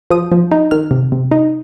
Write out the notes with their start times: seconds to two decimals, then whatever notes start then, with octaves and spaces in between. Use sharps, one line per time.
0.10 F3 D#6
0.32 F3
0.52 D#4
0.71 D#3 F6
0.91 C3
1.12 C3
1.31 D#4